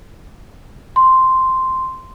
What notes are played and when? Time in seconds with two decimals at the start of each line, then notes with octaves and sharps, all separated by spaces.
0.96 C6